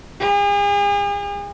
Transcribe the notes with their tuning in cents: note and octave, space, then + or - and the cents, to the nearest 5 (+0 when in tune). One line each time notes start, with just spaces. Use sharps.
G#4 -45